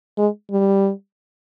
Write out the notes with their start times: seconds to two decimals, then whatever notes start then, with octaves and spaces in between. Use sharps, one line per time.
0.18 G#3
0.51 G3